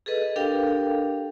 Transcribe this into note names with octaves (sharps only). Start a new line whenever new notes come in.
G#4 A4 B4 D#5
D4 G4 A4 A#4 F5 G5